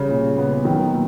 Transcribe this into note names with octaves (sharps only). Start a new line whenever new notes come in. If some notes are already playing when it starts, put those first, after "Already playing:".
Already playing: C#3 G3
A#2
B3
D#3 F#3
A#2